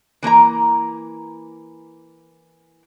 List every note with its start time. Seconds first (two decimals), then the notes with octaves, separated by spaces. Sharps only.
0.23 E3 A#3 C5 A#5